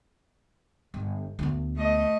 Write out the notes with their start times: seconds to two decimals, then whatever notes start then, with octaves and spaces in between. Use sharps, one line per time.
0.94 G1
1.39 D2 B3
1.77 A3 D#5